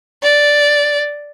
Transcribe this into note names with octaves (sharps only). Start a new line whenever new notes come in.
D5